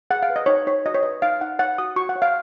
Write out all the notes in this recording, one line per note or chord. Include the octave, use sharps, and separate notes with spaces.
G#4 F#5
F5
B4
D#5
D#4 C#5
D#4 C#5
F#4 D#5
C#5
B4 D#5
D#4 F5
D#4 F#5
C#5 F#5
F#4 D#6
F#4 C#6
F#5
C#5
F5